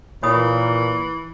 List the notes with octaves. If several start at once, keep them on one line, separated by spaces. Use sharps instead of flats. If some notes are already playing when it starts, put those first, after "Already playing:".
A#2 E3 C#5 B5 D#6